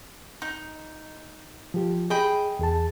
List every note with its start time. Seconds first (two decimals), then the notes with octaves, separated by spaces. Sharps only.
0.42 D#4
1.74 F3 G4
2.10 G#4 D#5 G5 B5
2.59 E2 G#4 A5